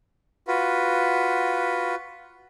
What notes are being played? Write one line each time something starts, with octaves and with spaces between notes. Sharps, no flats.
F4 F#4 B4